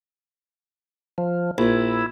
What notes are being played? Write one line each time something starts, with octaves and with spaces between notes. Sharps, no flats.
F3
A#1 E4